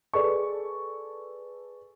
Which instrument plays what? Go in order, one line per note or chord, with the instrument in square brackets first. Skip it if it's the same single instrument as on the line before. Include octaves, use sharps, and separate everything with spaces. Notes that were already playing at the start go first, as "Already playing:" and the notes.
[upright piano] G#4 A4 B4 D5 C#6